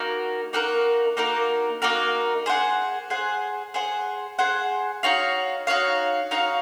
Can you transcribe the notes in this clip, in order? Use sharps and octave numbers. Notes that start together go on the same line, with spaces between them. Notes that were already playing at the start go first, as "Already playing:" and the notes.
Already playing: A#3 D#4 F#4 A#4
A#3 D#4 F#4 A#4
A#3 D#4 F#4 A#4
A#3 D#4 F#4 A#4
G#4 C5 F#5
G#4 C5 F#5
G#4 C5 F#5
G#4 C5 F#5
D#4 F#4 C#5 F5
D#4 F#4 C#5 F5
D#4 F#4 C#5 F5